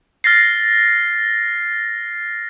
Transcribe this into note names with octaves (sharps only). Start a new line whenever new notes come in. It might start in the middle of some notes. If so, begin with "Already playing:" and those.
F6 A6 A#6 C7